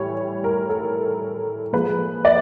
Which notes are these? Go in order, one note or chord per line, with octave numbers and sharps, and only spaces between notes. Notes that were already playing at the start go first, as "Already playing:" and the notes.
Already playing: A2 E3 G3 C#5
A#4
A4
A#2 F3 G#3 B4
D5